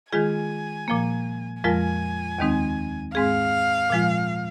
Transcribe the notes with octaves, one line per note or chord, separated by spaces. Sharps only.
D#3 G#3 F4 G#4 G#5
A#2 F3 A#3
F2 F3 G#3 F4 A#4 G#5
D#2 D#3 G#3 C4 D#4
G#2 G#3 C4 G#4 F5
A#2 F3 G#3 F4